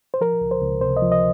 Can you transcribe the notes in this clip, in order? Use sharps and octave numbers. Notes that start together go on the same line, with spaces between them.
C5
F3 A#4
C#2
C5
C#2
C3 C5
D#5
F3
D#5